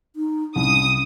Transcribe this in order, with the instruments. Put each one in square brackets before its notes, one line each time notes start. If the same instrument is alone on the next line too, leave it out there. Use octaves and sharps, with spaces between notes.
[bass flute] D#4
[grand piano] C2 [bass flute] C#4 [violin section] D#6